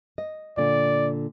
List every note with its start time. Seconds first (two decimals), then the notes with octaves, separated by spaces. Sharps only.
0.18 D#5
0.57 A#2 D3 D5